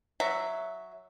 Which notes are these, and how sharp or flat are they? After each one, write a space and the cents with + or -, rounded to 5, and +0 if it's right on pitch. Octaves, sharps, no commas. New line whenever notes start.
F#3 +0 E5 +0